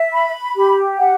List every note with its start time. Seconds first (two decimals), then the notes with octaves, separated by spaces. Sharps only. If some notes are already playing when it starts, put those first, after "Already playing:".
Already playing: E5
0.13 B5
0.56 G4
0.99 F#5